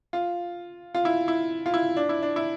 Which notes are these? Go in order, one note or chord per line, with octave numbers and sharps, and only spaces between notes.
F4
F4
E4
E4
F4
E4
D4
E4
D4
E4